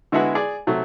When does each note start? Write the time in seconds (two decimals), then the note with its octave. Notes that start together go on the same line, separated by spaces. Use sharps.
0.12 D3 G#3 B3 E4 F#4 G#4
0.35 G#4 D5
0.67 C3 F#3 A3